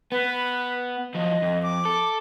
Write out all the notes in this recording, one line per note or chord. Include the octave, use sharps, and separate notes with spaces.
B3 B4
F3 F#3 D#5
F2
D6
A4